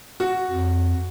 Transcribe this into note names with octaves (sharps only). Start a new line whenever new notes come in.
F#4
F2